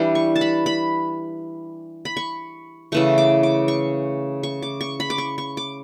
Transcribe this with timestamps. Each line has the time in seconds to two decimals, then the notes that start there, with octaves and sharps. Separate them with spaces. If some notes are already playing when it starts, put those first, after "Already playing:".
Already playing: E3 G3 D4
0.15 C#6
0.35 A5
0.41 B5
0.66 B5
2.05 B5
2.17 C#6
2.92 C#3 E3 A3 C#6
3.18 D6
3.43 D6
3.68 C#6
4.43 C#6
4.62 D6
4.81 C#6
5.00 B5
5.10 D6
5.18 C#6
5.38 C#6
5.57 D6